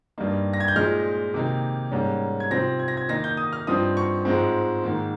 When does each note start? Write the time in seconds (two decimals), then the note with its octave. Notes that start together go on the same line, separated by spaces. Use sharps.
0.18 G2 G3 A#3 D#4
0.53 A#6
0.60 G#6
0.68 G6
0.75 A#2 F3 G#3 D#4 F6
1.34 C3 D#3 A#3 D#4
1.92 G#2 G3 A#3 C#4
2.40 G#6
2.50 C3 F3 C4 D#4 A#6
2.79 G#6
2.88 A#6
2.97 G#6
3.09 D#3 A#3 D#4 A#6
3.24 G6
3.37 D#6
3.53 F6
3.67 G2 F3 C4 D#4 D#6
3.97 C#6
4.25 G#2 F3 G#3 C4
4.83 G#2 D#3 A#3